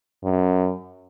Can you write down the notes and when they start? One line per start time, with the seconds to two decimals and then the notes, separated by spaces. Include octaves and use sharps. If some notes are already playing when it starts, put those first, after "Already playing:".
0.24 F#2